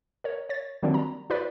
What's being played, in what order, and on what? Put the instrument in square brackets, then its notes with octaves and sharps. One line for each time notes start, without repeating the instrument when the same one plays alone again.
[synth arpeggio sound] A#4 C#5
C#5 A6
D#3 F#3 G3 A#3 C4 D4
A#5
E4 F#4 B4 D5